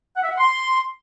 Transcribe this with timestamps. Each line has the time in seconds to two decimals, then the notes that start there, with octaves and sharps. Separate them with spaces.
0.16 F#5
0.23 E5
0.30 F#5
0.38 C6